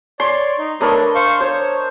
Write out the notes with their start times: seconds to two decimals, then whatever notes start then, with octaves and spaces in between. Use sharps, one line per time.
0.20 C#5 D5 C6
0.58 D#4
0.81 A3 D4 A#4 B4 C#5 D#5
1.15 C5 F5 C#6
1.41 C5 C#5